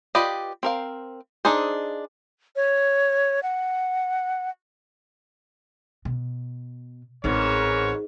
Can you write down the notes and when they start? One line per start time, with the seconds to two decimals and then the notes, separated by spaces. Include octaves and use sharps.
0.15 F4 G4 B4 D5 D#5
0.63 C4 A#4 F5
1.45 D4 D#4 G#4 C5
2.56 C#5
3.43 F#5
6.05 B2
7.24 A1 G#2 C4 A#4 B4 C#5